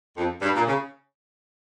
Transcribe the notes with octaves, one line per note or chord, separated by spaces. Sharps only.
F2
G2
A#2
C#3